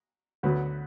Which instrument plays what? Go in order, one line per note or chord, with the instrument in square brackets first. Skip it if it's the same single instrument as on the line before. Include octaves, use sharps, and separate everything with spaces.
[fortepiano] D2 D3 F#3 B3